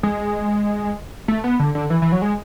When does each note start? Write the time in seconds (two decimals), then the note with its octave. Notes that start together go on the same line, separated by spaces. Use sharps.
0.03 G#3
1.28 A3
1.44 B3
1.59 D3
1.75 D3
1.90 E3
2.02 E3
2.12 F#3
2.22 G#3